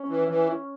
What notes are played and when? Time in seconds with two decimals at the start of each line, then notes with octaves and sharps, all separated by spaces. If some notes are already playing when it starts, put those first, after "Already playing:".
Already playing: C#4
0.08 E3
0.28 E3